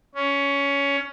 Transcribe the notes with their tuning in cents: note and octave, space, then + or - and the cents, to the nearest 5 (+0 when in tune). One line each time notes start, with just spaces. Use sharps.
C#4 +15